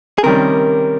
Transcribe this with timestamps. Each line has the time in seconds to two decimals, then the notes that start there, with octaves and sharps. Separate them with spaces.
0.18 G#4
0.23 C3 D#3 G3 C#4 A#4